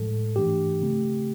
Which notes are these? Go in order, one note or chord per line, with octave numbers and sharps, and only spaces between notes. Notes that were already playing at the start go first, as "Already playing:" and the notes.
Already playing: A2 F3 G#3 A4
G#2 E3 A3 D4 G4
C#3 F3 A3 C4